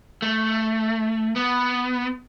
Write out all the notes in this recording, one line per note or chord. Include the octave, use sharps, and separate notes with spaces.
A3
B3